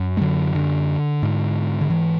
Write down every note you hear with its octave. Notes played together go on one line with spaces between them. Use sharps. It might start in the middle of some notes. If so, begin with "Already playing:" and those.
Already playing: F#2
G#3
D3 F#3
D3
G#2
D3
E3